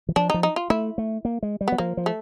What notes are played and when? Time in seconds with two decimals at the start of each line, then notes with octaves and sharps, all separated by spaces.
0.09 E3
0.16 F3 D4
0.30 F3 D#4
0.43 D#4
0.56 F4
0.70 A3 E4
0.98 A3
1.25 A#3
1.43 G#3
1.61 G3
1.68 F#3 B3
1.78 F3 A#3
1.97 F3
2.06 A3